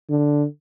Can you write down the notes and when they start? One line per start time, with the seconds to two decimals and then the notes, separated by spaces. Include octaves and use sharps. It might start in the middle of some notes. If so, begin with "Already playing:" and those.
0.10 D3